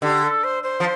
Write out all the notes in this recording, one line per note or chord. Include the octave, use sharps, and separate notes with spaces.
D3 G4
A4
C5
C5
F3